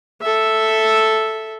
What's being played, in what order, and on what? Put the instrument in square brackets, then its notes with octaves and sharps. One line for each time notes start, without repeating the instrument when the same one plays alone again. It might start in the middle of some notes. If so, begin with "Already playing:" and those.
[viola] A4 E5